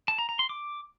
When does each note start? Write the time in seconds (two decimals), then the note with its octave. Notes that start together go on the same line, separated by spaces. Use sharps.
0.08 A5
0.18 A#5
0.29 A#5
0.39 C6
0.49 D6